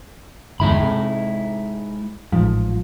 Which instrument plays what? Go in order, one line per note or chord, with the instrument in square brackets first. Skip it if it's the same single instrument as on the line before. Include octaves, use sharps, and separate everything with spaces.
[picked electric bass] G1 E2 [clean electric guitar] G#2 E4 B5
[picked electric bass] C3
[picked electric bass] A1 G#2 [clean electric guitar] F3